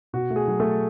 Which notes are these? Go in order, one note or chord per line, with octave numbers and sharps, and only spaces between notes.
B2 F#4
A3
G#4
F#3
A3 A4